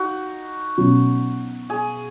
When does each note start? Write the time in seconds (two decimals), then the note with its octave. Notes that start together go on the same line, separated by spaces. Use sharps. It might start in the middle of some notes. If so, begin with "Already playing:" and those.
Already playing: D#4 F#4
0.78 B2 F#3 C#4
1.70 G#4